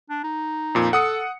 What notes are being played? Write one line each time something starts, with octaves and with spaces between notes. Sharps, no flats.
D4
D#4
F2 A#2
A4 F#5 D#6 C#7